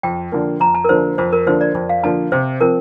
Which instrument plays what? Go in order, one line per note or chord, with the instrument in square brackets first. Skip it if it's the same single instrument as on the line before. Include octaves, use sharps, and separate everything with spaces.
[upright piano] F2 [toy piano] G5
[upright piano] D3 F3 A#3
[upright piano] F2 [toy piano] A#5
[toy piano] A5
A#4
[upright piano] D3 F3 A#3 [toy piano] C5
[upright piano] F2 [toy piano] C5
[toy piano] A#4
[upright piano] D3 F3 A#3 [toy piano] C5
[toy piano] D5
[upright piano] F2
[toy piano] F5
[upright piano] D3 F3 A#3 [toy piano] A5
[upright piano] C3 [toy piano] C5
[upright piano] F3 C4 [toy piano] A#4